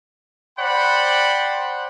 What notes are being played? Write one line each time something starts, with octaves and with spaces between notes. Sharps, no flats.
C5 D5 F#5 G5 B5